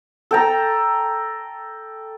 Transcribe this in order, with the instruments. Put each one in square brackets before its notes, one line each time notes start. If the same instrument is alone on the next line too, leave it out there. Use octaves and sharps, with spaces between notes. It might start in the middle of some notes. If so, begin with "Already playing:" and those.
[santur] A4 G5 A#5